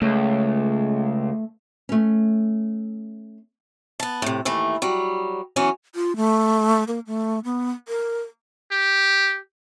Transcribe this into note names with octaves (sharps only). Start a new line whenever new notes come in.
C#2 A3
A3 C#4
B3 A5
A2 C3
D#2 A2 E3 A3
F#3 G3
E3 F#3 B3 C#4
F4
A3
A#3
A3
B3
A#4
G4